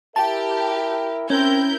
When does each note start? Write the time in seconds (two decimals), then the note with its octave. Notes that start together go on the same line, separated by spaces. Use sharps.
0.16 E4 G4 A#4 E5 A5
1.30 C4 C#4 E4 A#4 G6